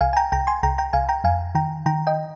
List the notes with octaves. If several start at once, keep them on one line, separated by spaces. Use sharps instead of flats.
C2 F5 G#5
G#5
G5 A#5
C2 G5 A#5
G#5 C6
C2 G5 A#5
G5 A#5
C2 F5 G#5
G5 A#5
F2 F5 G#5
D#3 G5 A#5
D#3 G5 A#5
D#5 G5